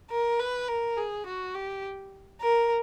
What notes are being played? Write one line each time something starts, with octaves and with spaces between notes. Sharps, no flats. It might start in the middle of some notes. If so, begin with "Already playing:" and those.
A#4
B4
A#4
G#4
F#4
G4
A#4